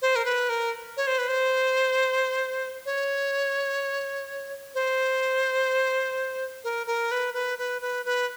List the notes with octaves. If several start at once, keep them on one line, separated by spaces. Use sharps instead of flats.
C5
A#4
B4
A#4
C#5
C5
B4
C5
C#5
C5
A#4
A#4
B4
B4
B4
B4
B4